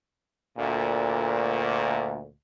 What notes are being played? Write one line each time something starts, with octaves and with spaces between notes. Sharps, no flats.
D2 A#2